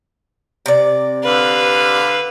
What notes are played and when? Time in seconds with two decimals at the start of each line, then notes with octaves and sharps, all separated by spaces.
0.66 C3 D5
1.24 D3 B4 F5